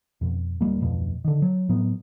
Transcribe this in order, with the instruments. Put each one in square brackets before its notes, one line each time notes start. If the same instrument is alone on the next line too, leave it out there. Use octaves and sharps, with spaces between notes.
[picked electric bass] F2 B2
D1 G3 A#3
D1 F2 B2
D3 D#3
F#3
A2 F#3 B3